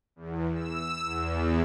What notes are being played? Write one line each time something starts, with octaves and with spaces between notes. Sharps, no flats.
E2
E6
E2